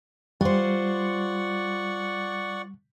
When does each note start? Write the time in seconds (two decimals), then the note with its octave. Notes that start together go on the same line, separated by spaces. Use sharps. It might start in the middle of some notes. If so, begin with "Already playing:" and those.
0.41 G3 F4 C5 D5 F#5 C#6